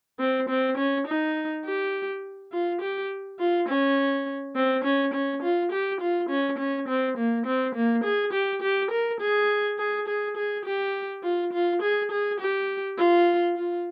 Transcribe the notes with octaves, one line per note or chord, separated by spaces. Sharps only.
C4
C4
C#4
D#4
G4
F4
G4
F4
C#4
C4
C#4
C#4
F4
G4
F4
C#4
C#4
C4
A#3
C4
A#3
G#4
G4
G4
A#4
G#4
G#4
G#4
G#4
G4
F4
F4
G#4
G#4
G4
F4
F4